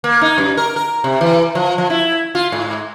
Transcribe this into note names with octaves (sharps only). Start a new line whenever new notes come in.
A#3
D#4
F#2
A#4
A#4
C3
E3
F3
F3
E4
F4
G#2